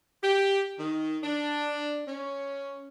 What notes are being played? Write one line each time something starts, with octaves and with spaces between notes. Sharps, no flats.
G4
D#3
D4
C#4